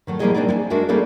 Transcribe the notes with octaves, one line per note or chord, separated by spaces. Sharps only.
D#3 F#3 A3
F3 G3 A#3 E4 G#4 D#5
C4 D4 D#4 G#4 D5
E4 G#5
G#3 D4 F#4 A#4 D5 E5
G3 A#3 C#4 D#4 G#4 A4